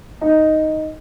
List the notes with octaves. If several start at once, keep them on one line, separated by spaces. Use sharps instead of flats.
D#4